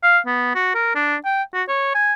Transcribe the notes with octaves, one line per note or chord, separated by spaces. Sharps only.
F5
B3
F#4
A#4
D4
G5
F#4
C#5
G#5